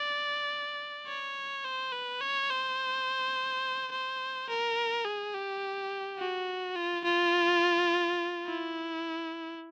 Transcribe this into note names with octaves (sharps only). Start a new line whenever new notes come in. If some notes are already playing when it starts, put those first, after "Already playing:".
Already playing: D5
C#5
C5
B4
C#5
C5
C5
A#4
G#4
G4
F#4
F4
F4
E4